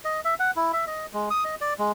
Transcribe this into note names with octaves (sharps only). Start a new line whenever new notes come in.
D#5
E5
F#5
E4
E5
D#5
G#3
D#6
D#5
D5
G#3